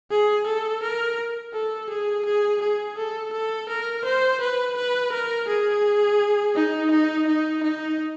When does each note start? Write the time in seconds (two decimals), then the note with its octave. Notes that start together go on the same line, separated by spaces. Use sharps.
0.11 G#4
0.46 A4
0.83 A#4
1.53 A4
1.90 G#4
2.25 G#4
2.61 G#4
2.97 A4
3.33 A4
3.69 A#4
4.05 C5
4.40 B4
4.77 B4
5.12 A#4
5.48 G#4
6.55 D#4
6.91 D#4
7.27 D#4
7.63 D#4